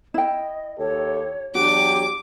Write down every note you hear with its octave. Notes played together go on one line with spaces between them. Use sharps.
E4 D#5 G5
D#2 G4 A4 C#5
E2 F#3 D4 F#4 G4 D6